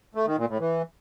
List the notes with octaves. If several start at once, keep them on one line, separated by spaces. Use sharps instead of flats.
A3
D#3
A#2
A2
E3